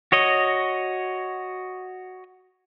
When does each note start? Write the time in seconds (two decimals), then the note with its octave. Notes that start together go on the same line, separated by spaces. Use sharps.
0.12 F#4 C#5 D#5